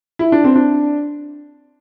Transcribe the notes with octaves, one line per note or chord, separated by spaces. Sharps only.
E4
D4
C4
D4